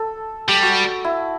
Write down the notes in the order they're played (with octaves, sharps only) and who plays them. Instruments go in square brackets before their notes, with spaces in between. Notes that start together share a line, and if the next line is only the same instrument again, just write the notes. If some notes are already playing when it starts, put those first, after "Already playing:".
Already playing: [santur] A4
[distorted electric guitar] G3 [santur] G4
[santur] F#4
E4